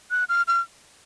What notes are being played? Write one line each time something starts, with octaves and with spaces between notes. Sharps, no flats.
F#6
F6
F6